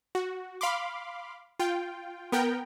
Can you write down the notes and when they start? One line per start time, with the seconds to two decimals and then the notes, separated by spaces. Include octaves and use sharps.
0.15 F#4
0.61 F5 B5 C6 D6
1.59 F4 G5
2.32 B3 A#4 G5